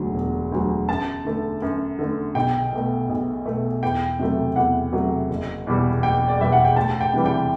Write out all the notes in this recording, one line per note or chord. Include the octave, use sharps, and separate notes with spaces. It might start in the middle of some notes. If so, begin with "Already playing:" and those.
Already playing: E1 D2 D3 F#3
E1
D2 D3 F#3
F#2 A5
D3 A3
F#2
D3 A3
B1 G5
B2 A3
B1
B2 A3
E2 G5
C3 F#3 A3
E2 F#5
C3 F#3 A3
F#1
E2 B2 G3
F#1 G5
D5
E2 B2 G3 E5
F#5
G5
D2 A5
G5
C3 E3 G3
G5